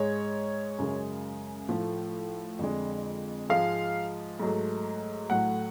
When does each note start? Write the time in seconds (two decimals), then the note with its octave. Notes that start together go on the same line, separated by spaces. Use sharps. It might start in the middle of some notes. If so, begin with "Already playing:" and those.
Already playing: G#2 G#3 C#5
0.78 F#2 C#3 G#3
1.69 A2 F3 A3
2.59 F2 D3 G#3
3.49 G#2 F3 G#3 F5
4.40 G#2 F#3 A3
5.30 A2 F#3 A3 F#5